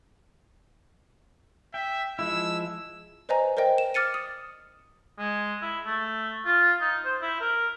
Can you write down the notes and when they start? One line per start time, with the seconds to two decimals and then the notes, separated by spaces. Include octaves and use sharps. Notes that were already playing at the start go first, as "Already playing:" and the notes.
1.74 E5 G5
2.19 F3 G#3 E4 E6
3.29 B4 C5 D5 D#5 G#5 A#5
3.57 A#4 C5 D5 D#5 G5
3.78 E7
3.94 D6 F6 A6 C#7 D#7
4.14 D#6
5.19 G#3
5.62 E4
5.86 A3
6.46 F4
6.81 D#4
7.05 C5
7.22 E4
7.41 A#4